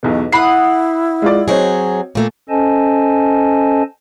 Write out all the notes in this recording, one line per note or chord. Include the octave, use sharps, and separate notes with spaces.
B1 E2 B2
E4 F#5 B5 D#6 C7
G#3 F4 D5
F#3 C4 G#4 C#5 D#5
A#2 A3 A#3
C#4 A4 C5 D#5 G#5 A5